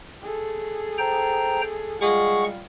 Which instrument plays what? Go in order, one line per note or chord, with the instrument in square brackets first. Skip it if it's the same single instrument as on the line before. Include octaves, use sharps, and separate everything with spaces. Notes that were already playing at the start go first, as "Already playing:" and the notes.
[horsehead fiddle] G#4 A4
[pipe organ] C5 G5 A#5
[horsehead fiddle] G3 F4 [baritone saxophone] G#3 [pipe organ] F#5 C#6